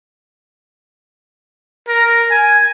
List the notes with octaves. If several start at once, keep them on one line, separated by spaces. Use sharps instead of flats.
A#4
G#5